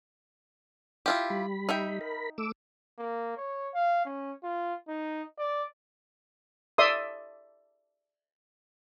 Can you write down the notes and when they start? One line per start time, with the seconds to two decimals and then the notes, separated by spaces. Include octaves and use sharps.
1.06 E4 F4 G4
1.30 G3 B5
1.69 D#4 E5 G5
2.01 A#4 B5
2.38 A3 D6 E6
2.99 A#3
3.37 C#5
3.75 F5
4.05 C#4
4.44 F4
4.89 D#4
5.39 D5
6.78 D5 E5 C6 D#6